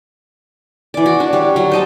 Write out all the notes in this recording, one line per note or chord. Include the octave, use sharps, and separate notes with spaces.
E3 D5
F#4
D4
G3 C#5
F#3 G3
C5 D#5 A5